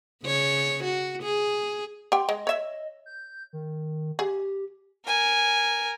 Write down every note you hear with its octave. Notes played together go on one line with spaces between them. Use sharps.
C#3 C#5
F#4
G#4
G4 G5 C6
G#3 D#5
C#5 E5
G6
D#3
G4 G#4
A#4 G#5